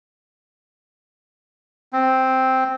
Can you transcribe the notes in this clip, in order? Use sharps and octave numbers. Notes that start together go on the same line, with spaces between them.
C4